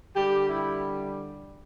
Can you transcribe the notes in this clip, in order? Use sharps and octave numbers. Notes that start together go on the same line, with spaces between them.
D3 G3 G4
E4